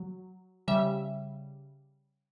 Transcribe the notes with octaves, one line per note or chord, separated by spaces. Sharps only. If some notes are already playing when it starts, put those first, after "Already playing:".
Already playing: F#3
C#3 G3 E5